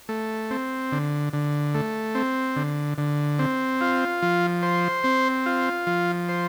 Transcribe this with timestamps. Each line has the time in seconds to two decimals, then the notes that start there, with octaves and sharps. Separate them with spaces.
0.09 A3
0.50 C4
0.92 D3
1.33 D3
1.74 A3
2.15 C4
2.56 D3
2.98 D3
3.39 C4
3.81 F4
4.22 F3
4.63 C5
5.04 C4
5.46 F4
5.87 F3
6.29 C5